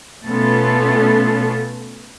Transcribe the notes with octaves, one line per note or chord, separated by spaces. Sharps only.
B2 A3 B3 C#4 F4 A4